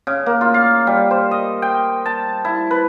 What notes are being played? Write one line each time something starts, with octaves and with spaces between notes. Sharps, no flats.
C#3
A#3
F4
F5
G3
C5
D#5
G5
A5
E4
B4